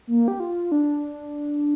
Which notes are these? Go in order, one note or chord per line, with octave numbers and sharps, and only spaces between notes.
A#3
G4
F4
D4